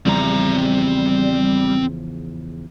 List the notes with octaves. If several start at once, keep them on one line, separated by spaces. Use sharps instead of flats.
E2 C#3 F3 G3 C4 A#5